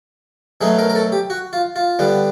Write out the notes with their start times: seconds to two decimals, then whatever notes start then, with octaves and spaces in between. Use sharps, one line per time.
0.61 B2 F#3 A3 C#4 G#4
0.79 A#4
0.90 A#4
0.95 A4
1.12 G4
1.30 F#4
1.53 F4
1.76 F4
1.99 D3 G3 B3 D4